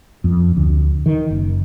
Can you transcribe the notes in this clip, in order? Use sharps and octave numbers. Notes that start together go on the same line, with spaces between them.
F2
D2
D#3
F#1